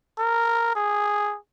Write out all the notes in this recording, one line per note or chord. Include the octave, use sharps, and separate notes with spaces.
A#4
G#4